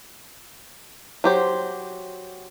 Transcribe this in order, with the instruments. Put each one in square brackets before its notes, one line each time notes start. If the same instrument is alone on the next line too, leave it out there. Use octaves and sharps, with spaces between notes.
[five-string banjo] F#3 G4 C5